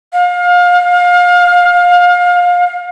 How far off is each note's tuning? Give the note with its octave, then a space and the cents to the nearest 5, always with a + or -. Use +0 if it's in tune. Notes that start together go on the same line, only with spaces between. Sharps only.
F5 +30